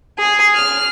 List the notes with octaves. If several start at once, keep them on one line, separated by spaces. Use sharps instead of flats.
G#4
F6